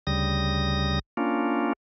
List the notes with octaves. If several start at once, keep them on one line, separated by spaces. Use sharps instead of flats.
D2 C#3 G3 D#6 A#6
A#3 C#4 D4 F4